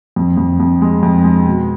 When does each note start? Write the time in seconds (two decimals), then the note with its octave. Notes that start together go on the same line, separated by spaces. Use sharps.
0.16 F2
0.37 F2
0.60 F2
0.82 G#3
1.03 F2
1.24 G#3
1.46 B2